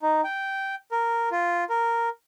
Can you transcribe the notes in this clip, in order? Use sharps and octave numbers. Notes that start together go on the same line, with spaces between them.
D#4
G5
A#4
F4
A#4